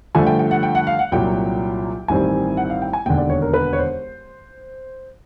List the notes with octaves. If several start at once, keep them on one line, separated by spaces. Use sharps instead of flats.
G2 D3 F3 A3 G#5
G5
G5
F#5
G5
F#5
F5
F#5
C2 A#2 F#3 G5
A1 G2 D#3 G3 C4 G#5
F#5
F5
G5
G#5
E1 D#2 D3 G5
D5
C#5
A#4
B4
C#5
C5